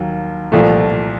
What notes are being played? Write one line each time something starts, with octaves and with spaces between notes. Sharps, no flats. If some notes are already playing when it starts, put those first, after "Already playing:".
Already playing: D#2 D#3 F#3 A#3
C2 A#2 F3 A3